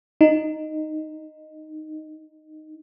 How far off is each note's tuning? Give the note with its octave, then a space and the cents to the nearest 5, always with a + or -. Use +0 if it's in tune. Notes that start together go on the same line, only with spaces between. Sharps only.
D#4 -5